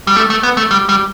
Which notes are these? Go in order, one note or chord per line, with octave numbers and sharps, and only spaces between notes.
G3
A3
A3
B3
A3
G3
G3